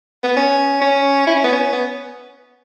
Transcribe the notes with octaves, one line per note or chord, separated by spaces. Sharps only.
B3
C#4
C#4
E4
C#4
B3
C#4
B3